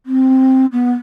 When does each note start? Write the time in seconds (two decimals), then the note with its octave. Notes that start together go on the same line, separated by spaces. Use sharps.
0.06 C4
0.72 B3